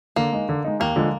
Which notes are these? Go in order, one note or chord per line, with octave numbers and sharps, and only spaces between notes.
D3 A#3
G#3 D#4
D3
G#3 D#4
D#2 A#3
D3 F3 G#3